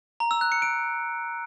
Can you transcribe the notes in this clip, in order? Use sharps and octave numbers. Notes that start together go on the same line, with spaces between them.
A#5
E6
F#6
C#7
D7